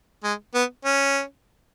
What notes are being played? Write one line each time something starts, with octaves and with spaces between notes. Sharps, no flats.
G#3
B3
C#4